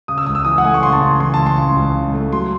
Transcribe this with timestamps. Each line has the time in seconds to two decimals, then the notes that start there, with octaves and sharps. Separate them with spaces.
0.08 C#3 D#6
0.18 E6
0.26 C#2 D#6
0.35 E6
0.45 E3 D#6
0.58 F#5
0.64 A3 G#5
0.74 C#6
0.83 C#3 C6
0.93 A5
1.02 C#3
1.20 E3 C6
1.34 C#2 A5
1.46 C6
1.58 C#3
1.76 C#2
1.95 C#3
2.14 A3
2.32 F#3 C6